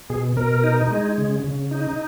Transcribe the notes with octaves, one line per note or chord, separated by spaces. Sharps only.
B2 G#4
B2 A#4
D#4
G#3
C#3
C#3
D#4